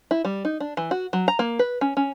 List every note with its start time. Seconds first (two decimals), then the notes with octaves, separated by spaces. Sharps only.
0.11 E4
0.25 G3
0.45 D#4
0.60 D4
0.77 E3
0.91 F#4
1.13 F#3
1.28 A#5
1.39 A#3
1.59 B4
1.81 C#4
1.97 C#4